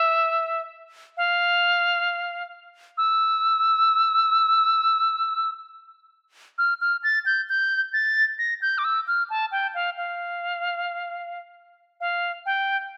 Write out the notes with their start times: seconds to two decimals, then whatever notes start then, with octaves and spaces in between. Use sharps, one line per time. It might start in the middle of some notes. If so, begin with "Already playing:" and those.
Already playing: E5
1.17 F5
2.98 E6
6.58 F6
6.81 F6
7.04 A6
7.26 G6
7.49 G6
7.93 A6
8.38 A#6
8.62 G6
8.78 D6
8.84 E6
9.07 F6
9.30 A5
9.52 G5
9.75 F5
9.97 F5
12.00 F5
12.46 G5